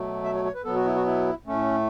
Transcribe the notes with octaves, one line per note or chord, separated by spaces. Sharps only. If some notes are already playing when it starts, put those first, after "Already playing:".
Already playing: B2 F#3 A3
E5
C#5
C#5
B4
B2 F#3 B3 A4
F#4
E4
F#4
E4
A2 A3 C#4